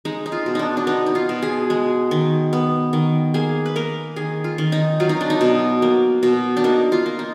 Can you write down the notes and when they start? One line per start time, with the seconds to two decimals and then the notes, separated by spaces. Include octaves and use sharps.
0.05 G#3 D#4
0.26 D#4
0.32 F4
0.46 B2
0.55 D4 D#4
0.77 D4
0.87 B3 D#4
1.06 D#4
1.15 F4
1.29 B2
1.42 G#4
1.70 G#3
2.11 D#3
2.53 B3
2.93 D#3
3.34 A#3 G#4
3.65 B4
3.76 A#3 A#4
4.16 D#3 G#4
4.44 F4
4.58 D#3
4.72 D#4
5.00 F#3 F4
5.09 D#4
5.21 D4
5.30 D#4
5.41 B2
5.82 A#3
6.23 B2
6.57 D4
6.64 A#3 D#4
6.92 F4
7.06 A#3
7.19 D#4